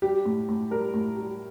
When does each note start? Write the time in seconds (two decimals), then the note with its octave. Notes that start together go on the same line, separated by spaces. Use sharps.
0.02 G3 G4
0.25 A2
0.49 A2
0.71 G3 A#4
0.94 A2
1.17 G3